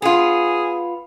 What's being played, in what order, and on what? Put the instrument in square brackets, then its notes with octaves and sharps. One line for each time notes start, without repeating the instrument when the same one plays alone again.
[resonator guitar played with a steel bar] B3 F4 [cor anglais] G#4